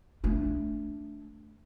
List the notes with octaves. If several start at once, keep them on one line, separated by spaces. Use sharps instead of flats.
A3 D4